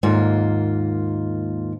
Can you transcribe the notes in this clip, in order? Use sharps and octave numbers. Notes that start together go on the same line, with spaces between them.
D#2 G#2 A#3 F4